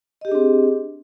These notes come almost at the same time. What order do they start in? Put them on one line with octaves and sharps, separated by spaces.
D#5 G4 G#4 D4 C4